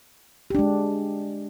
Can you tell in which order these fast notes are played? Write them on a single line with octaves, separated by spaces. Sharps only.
G4 D4 G#3